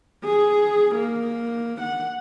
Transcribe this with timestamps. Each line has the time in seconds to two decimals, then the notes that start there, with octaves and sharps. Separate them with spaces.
0.25 G#4
0.95 A#3
1.81 F#5